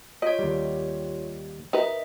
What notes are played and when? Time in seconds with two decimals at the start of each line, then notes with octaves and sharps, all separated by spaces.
0.22 F4 C#5 D#5
0.39 D#2 G3
1.73 D#4 A#4 B4 D#5 E5